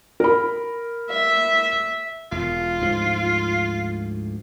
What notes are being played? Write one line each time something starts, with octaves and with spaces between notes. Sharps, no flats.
A#4 B5
E5
E1 F4
D2 G#2 F3